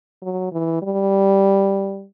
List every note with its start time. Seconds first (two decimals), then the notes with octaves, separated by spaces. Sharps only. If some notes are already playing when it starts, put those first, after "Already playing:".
0.22 F#3
0.52 E3
0.82 G3